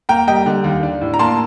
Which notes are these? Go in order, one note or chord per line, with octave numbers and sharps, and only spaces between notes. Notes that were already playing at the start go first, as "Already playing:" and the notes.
A#3 G5 A#5
G3 D#5 G5
D3
D#2
D4
A2
A#5
A#3 A5 C6